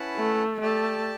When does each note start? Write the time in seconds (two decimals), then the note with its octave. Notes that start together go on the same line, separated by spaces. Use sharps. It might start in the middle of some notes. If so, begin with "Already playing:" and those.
Already playing: C#4 E4 B4 F#5 A5
0.17 A3
0.61 A3 G4 D5 A5